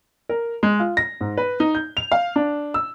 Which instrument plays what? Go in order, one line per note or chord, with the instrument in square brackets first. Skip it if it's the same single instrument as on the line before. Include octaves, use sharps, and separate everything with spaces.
[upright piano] A#4
G#3
F4
A#6
G#2
B4
D#4
G6
F7
F5
D4
E6